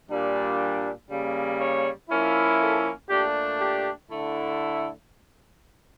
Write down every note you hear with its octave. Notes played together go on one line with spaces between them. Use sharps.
A#2 G3 D4
C#3 G3 A#3
C#5
F3 A#3 C#4 E4
A4
A#2 A3 D4 G4
G4
D3 A3 E4